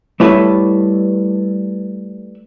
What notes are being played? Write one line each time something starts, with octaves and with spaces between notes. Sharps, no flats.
G3 A3 E4 A4 B4 C#5